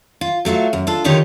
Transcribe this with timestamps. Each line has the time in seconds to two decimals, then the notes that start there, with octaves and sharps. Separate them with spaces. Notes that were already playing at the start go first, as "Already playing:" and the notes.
0.21 F4
0.45 F#3 A3 F4 F#4
0.73 F#2
0.87 D4 F4 A4
1.04 D3 D#3 D#4 F4 G4 C#5